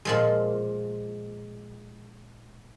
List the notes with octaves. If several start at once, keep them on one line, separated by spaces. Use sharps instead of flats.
A#2 F3 G#3